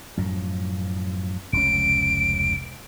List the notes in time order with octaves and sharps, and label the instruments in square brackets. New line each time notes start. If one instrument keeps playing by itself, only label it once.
[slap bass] F#2 A2 F3
[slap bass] F1 C#2 C#4 [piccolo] D7